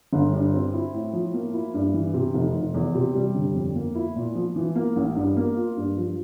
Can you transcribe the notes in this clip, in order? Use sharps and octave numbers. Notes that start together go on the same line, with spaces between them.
G1
G2
C4
E4
A2
F3
A#3
E4
G2
E3
C3
F1
F1
E2
C3
G3
G1
F2
A#3
E4
A#2
F3
E3
A#3
A1
G2
A#3
F4
G2
F3